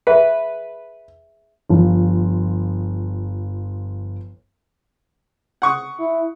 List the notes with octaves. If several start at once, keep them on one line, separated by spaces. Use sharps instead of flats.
G#4 B4 E5 F#5
G1 F3
F#5 C#6 D#6
E4